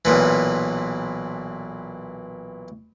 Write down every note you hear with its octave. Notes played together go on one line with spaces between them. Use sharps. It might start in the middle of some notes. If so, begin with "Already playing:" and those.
B1 A#2 E3